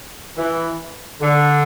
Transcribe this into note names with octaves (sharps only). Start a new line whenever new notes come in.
E3
D3